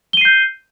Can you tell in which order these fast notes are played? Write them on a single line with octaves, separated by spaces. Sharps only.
G7 D#7 C7 G6